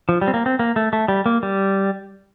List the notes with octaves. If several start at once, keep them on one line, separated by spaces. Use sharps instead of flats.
F3
G3
C4
A#3
C4
A#3
A3
A3
G3
A#3
G3